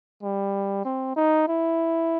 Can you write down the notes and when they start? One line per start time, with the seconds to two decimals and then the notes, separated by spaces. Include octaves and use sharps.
0.23 G3
0.85 C4
1.17 D#4
1.48 E4